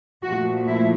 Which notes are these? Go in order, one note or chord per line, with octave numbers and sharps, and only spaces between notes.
A#2 F3 A3 F#4
E4